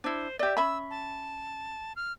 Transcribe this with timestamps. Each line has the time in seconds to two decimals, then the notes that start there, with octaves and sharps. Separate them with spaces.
0.04 D4 E4 C5
0.39 G4 D5 E5
0.57 C#4 E5 B5 E6
0.90 A5
1.96 F6